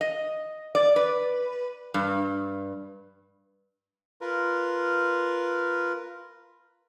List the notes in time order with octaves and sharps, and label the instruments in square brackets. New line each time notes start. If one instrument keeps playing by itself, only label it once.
[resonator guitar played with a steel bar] D#5
D5
B4
G2
[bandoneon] F4 A#4 B4